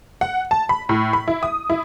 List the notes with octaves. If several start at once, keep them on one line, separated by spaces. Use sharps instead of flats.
F#5
A5
B5
A2
B5
E4
D#6
E4